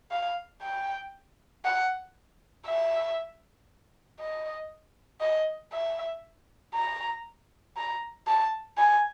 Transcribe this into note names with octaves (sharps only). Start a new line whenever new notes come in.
F5
G5
F#5
E5
D#5
D#5
E5
A#5
A#5
A5
G#5